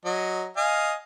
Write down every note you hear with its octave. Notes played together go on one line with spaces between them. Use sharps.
F#3 D#5
D#5 F5 G#5